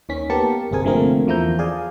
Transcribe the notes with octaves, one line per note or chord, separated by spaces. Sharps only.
D#2 D#3 C#4 B6
A#3 B3 G4 A#4 A5 C#7
G1 C2 C4 G#4 A#4 G#5
D3 F3 A3 A#3 C4 A#4
E2 F3 E4 A#5 G6
G#4 D5 F5 G#5